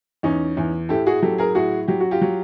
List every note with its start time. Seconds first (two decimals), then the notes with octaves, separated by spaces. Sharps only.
0.23 E2 C#4 D#4
0.57 E2
0.89 A2 G4 A4
1.06 F#4 G#4
1.23 F#3 G4 A4
1.38 G#4 A#4
1.55 A2 F#4 G#4
1.88 F#3 G4
2.00 F#4
2.11 F4 G4
2.22 F#3